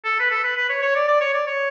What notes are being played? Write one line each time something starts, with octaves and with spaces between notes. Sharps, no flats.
A4
B4
A4
B4
B4
C#5
C#5
D5
D5
C#5
D5
C#5